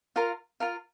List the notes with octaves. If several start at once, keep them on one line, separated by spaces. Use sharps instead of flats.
F4 A#4 F5
F4 A#4 F5